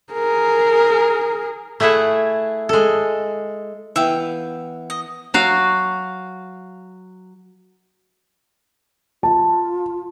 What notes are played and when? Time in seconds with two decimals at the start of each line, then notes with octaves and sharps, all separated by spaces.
0.13 G#4 A#4
1.80 A3 E4 G#4 E5 F#5
2.69 G#3 A4
3.96 E3 B3 E5 F5 G5
4.90 D#5
5.34 F#3 F#4 F5
9.23 F4 A5